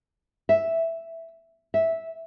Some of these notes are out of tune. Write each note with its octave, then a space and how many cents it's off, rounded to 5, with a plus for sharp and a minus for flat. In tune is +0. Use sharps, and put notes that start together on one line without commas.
E5 +0
E5 -10